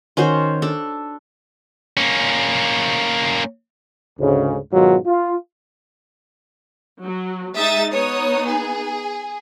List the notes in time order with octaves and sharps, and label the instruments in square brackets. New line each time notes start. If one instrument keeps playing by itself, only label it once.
[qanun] D#3 C#4 F#4 C5
D4 A4
[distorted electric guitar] A#3 C#4
[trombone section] D2 G#2 C#3
G#2 B2 D#3 F#3 F4 F#4
F4
[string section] F#3
[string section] G#3 D#4 [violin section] E5 D#6 A6
[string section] B3 D#4 [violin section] C#5 D#6
[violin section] G#4